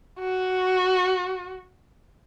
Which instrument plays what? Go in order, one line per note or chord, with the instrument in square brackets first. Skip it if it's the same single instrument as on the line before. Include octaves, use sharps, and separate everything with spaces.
[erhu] F#4